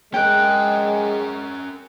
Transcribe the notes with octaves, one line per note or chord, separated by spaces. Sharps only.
G#3 C#4 A#4 G5 F#6